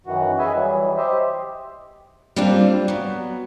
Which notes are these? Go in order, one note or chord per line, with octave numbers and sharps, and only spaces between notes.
F#2 D#3 E3 F#4
G#4 B4 D#5 E5 G#5
E3 F#3 G3
G4 C5 D#5 E5
G3 A#3 C4 D4 F4
F#3 B3